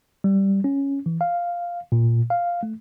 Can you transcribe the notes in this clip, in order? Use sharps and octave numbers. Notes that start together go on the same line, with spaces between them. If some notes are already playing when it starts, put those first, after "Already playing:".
G3
C#4
E3
F5
A#2
F5
A3